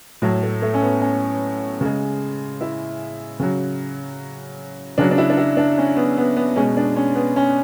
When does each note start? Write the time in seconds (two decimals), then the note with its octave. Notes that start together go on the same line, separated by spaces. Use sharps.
0.22 A2 F#3
0.43 A3
0.62 A3
0.74 C#4
0.82 B3
1.01 C#4
1.81 C#3 G#3
2.61 E4
3.40 C#3 F#3
4.98 C#3 F#3 D4
5.11 D4
5.18 E4
5.30 D4
5.37 E4
5.57 D4
5.78 C#4
5.96 B3
6.17 B3
6.37 B3
6.56 B2 G#3 C#4
6.77 D4
6.96 C#4
7.15 B3
7.36 C#4